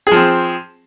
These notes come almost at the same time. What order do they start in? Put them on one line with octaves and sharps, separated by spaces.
G#4 F3 C4